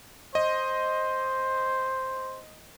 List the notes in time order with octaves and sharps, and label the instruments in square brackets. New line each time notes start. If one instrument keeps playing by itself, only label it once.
[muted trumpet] C5 [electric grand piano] D#5